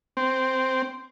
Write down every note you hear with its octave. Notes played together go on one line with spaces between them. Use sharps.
C4